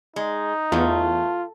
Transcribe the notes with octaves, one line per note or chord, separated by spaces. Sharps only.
G#3 D#4
E2 A3 F4